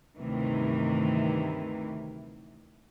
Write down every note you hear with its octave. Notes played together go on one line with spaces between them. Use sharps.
D2 G2 C3 D#3 E3